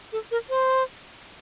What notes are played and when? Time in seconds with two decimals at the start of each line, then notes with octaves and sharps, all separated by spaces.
0.12 A4
0.31 A#4
0.49 C5